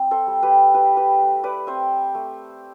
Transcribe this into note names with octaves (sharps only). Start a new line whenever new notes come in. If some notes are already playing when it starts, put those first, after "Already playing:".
Already playing: C4 E4
A4 C5
G3
G4 B4
E4 G4 B4
G4 B4
A3
B4 D5
C4 C5 E5
A3